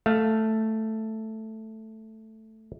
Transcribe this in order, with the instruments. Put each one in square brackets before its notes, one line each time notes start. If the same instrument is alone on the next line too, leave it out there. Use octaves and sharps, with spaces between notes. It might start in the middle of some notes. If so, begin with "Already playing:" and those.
[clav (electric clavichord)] A3 F5